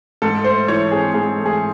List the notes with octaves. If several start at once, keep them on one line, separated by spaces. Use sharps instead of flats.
G#2 A4
A3 C5
E3 C#5
C4 G#4
G#2 G#4
A3
G#4